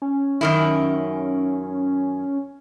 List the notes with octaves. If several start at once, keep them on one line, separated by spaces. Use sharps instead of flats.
C#4
F#2 D#3 E4